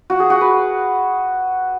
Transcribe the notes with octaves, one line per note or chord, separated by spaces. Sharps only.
F#4
G#4
F#4
B4